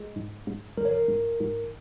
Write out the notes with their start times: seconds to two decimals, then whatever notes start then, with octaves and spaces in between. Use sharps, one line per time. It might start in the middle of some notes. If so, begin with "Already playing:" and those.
Already playing: G#3
0.16 G#2
0.47 G#2
0.78 G#2 A#4
0.85 C#5
0.91 A#4
1.08 G#2
1.40 G#2